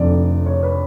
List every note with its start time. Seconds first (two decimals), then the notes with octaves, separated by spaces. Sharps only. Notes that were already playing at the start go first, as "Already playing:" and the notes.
Already playing: F1 F2 D3 D5
0.46 C#5
0.63 B4